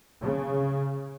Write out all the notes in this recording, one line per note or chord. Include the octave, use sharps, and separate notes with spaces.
C#3